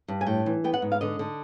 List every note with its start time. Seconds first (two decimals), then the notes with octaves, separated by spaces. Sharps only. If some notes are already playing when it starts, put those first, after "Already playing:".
0.08 G2
0.21 G#5
0.26 A2 G5
0.46 E3
0.64 B3 G5
0.74 F#5
0.82 G#2
0.92 F5
1.01 D3 D#5
1.19 D3